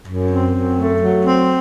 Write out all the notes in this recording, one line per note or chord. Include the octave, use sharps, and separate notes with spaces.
F#2
C4
F#2
A3
F#3
C4